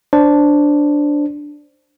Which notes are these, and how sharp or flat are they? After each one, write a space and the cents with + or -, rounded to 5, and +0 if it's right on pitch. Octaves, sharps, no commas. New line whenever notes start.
D4 +0 C5 +0